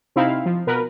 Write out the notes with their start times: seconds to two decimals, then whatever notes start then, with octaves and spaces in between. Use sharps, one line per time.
0.16 C3 C4 D#4 E4 F5
0.46 F3
0.67 B2 A#4 B4